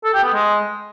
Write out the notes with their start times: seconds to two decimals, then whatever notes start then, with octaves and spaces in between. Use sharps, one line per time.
0.04 A4
0.14 G4
0.24 B3
0.33 G#3